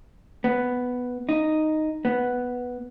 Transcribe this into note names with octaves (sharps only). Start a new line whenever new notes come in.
B3
D#4
B3